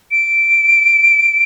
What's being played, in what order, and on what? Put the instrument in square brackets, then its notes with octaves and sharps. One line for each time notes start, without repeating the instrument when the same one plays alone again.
[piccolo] D7